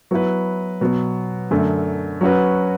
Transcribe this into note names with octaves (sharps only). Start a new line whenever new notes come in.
F#3 B3 E4 B4
B2 F#3 B3
F#2 D3 A3
F#3 C#4 F#4 B4